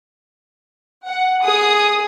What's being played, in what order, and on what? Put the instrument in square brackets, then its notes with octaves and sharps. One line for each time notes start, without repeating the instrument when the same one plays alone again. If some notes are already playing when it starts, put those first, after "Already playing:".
[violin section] F#5
[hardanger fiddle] G#4 [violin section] D#6